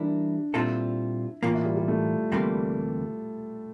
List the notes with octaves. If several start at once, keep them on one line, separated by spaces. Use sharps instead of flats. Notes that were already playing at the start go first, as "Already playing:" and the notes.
Already playing: E3 G3 A#3 D4 E4
A#2 G3 C4 E4 F4 A4
A2 E3 A#3 F4
E4
G3
G3
A3
D2 C3 E3 G3 A#3